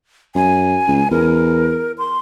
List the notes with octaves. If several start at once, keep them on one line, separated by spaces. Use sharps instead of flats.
F#2 G#5
C#2
E2 A#4
C6